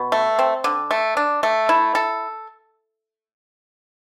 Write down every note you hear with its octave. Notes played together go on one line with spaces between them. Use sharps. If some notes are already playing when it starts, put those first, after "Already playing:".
Already playing: B2
A3
C4
D3
A3
D4
A3
E4
A4